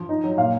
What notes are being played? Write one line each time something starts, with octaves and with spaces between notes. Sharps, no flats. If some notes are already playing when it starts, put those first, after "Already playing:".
Already playing: F3
D#4
F#3
A#2 F5